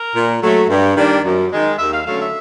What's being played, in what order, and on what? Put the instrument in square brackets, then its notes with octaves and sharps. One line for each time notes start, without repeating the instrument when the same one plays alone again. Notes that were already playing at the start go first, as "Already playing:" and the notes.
Already playing: [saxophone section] A#4
A#2
F#3 A3
G2
D#3 G3 A#3 D4
F#2
D#3 G#3
D#2 E5
F5
D3 F#3 A3 C#4 F5
E5